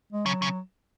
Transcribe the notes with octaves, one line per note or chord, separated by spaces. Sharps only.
G#3
C#3 F#3
C#3